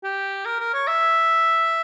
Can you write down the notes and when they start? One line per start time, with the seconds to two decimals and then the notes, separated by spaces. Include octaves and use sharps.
0.03 G4
0.45 A#4
0.60 A#4
0.74 C#5
0.87 E5